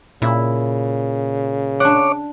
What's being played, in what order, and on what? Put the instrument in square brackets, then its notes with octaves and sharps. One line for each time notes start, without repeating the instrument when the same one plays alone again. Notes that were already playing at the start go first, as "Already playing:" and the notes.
[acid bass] A#2 [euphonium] C#3 [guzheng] E4
[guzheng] D4 F#5 [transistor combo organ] C#5 D6